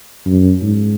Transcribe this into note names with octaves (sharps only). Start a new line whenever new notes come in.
F#2
G#2